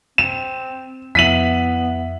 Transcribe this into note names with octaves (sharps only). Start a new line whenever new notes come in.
C4 E7
F2 B3 E4 E5 B6 D#7 F#7